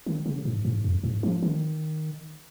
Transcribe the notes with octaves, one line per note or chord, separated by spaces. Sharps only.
D#3
C#3
G#2
G#2
F2
G#2
F3
D#3